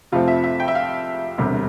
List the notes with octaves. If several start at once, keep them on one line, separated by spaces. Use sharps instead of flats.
F2 C3 F3 A3 C4 F4
E5
E5
G5
E5
F5
E1 D2 C3 G3